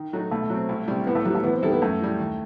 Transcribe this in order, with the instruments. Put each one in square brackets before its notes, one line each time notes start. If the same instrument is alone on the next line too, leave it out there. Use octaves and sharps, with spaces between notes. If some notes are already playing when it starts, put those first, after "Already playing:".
Already playing: [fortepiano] D#3
F#3 A3 D#4
[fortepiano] B2 [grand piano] A3
[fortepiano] F#3 C4
C2
C3 E3 G3
[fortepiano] A2 [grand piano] B3
[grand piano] A3
[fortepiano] F#3 [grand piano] G3
[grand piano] A3 [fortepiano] B3
[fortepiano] E2 [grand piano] B3
[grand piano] C4
[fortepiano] D#3 A3 E4 A4 [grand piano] G3
[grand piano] B3
[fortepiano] F#2 [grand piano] A3
[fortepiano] E3 G3
D#2